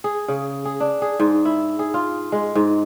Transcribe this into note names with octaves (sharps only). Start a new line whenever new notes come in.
G#4
C#3
G#4
D4
G#4
G#2
E4
G#4
F4
G#3
G#2